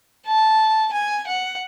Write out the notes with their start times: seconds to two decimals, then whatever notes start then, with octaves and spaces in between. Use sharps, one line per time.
0.26 A5
0.93 G#5
1.27 F#5